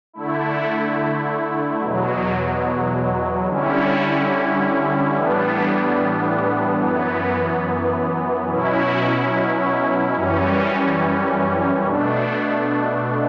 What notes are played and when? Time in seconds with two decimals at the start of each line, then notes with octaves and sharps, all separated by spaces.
0.13 D3 A3 E4
1.80 E2 B2 F#3
3.48 D3 G3 C#4 E4
5.15 A2 E3 G3 B3 D4
6.81 F#2 E3 B3
8.48 B2 F#3 C#4 E4
10.15 F#2 E3 G3 C#4
11.82 B2 A3 D4